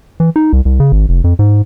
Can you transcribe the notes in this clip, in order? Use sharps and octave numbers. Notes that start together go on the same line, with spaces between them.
E3
D#4
C2
C2
C#3
G#1
F1
F2
G#2